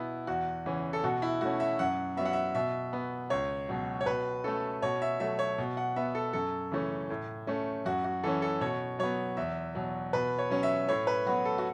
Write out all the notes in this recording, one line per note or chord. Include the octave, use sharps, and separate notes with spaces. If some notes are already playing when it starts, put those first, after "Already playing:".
Already playing: B2 B3 E4
E2 F#4
C#3 E3 C#4
A4
B2 F#4
E4
A3 C#4 F#4
E5
F#2 F#5
F#3 B3 E5
F#5
E5
B2 E5
B3
C#2 C#5
B2 F#3
C#5
B2 B4
A3 C#4 A4
B2 C#5
E5
F#3 A3 E5
C#5
B2
F#5
B3 E5
A4
F#2 A4
C#3 E3 A3 C#4
A2
A3 C#4
F#2 F#4
F#4
E3 C#4 A4
A4
B2 C#5
F#3 B3 C#5
E2 E5
B2 F#3
B2 B4
C#5
F#3 C#4
E5
A2 C#5
B4
F#3 B3 F#4
A4
F#4